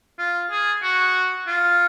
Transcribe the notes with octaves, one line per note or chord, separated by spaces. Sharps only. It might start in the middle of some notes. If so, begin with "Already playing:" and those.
F4
G#4
F#4
F4